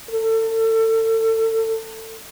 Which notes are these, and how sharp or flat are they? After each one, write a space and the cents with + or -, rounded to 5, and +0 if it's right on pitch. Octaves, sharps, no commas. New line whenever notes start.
A4 +30